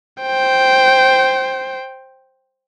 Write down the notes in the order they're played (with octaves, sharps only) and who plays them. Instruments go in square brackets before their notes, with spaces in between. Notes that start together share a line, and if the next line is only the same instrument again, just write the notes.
[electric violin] C5 G5